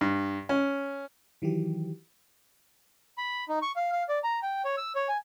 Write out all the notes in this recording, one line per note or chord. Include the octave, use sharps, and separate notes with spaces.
G2
C#4
D#3 E3 F#3 G4
B5
D#4
C#6
F5
F5
D5
A#5
G5
C#5
E6
C#5
G#5